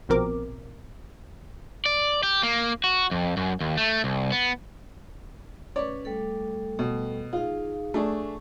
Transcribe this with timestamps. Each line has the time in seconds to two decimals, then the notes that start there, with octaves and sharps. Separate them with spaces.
0.09 A#1 B2 F3 C4 A#4 D6
1.86 D5
2.23 G4
2.43 A#3
2.84 F#4
3.11 F2
3.37 F#2
3.60 D#2
3.77 A3
4.04 C2
4.32 B3
5.76 C#4 B4 C#5 D5
6.05 G3 A3 A4
6.79 B2
7.33 D#4 F4 G#4 F5
7.94 A3 D4 G#4 C#6